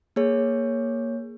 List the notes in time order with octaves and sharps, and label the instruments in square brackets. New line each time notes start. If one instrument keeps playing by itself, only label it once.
[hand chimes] A#3 G#4 C#5